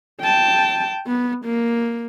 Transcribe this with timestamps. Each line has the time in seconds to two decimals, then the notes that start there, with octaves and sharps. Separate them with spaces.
0.21 G5 A5
1.07 B3
1.45 A#3